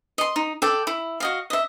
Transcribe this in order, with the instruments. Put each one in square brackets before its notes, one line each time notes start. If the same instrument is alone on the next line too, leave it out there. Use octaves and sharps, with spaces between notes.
[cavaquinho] D#5 C6
D#4
A4 D5 G5
E4
F#4 D#5 F5
D#5 E5